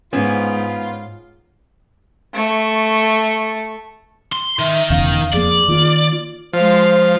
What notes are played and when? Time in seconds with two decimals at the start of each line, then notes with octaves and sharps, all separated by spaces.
0.13 G#2 B3 C#4 F4
2.34 A3 C#6
4.32 C6
4.59 D#3 E5
4.90 E1 E2 C#3 F5
5.33 F2 A#3 G#4 D5
5.68 D#3 A#3 F4
6.53 F3 G#3 C5 F5